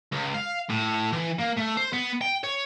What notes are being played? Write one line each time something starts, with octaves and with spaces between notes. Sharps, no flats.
C#2
F5
A2
E3
A#3
A3
C5
B3
G5
C#5